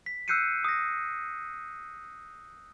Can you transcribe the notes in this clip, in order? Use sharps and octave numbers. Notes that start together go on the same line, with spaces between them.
B6
E6 F#6 G6 C7 C#7 D#7
D#6 A#6